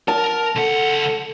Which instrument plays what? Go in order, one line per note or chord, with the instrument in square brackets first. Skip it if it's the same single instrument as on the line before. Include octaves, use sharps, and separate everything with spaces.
[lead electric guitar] A#4 [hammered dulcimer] A5
[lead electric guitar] C#2 F#5 [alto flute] A4